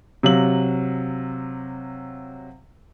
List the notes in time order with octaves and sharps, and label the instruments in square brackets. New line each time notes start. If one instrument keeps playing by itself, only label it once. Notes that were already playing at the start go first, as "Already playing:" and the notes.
[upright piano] C3 F#3 F5 F#7